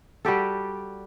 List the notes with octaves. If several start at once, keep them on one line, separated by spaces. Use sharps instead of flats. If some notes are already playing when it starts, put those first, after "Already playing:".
G3 F#4 G4 A4